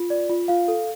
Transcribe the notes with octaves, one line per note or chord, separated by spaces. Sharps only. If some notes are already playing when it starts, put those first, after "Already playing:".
Already playing: F4
D5
F4
F4 F5
A4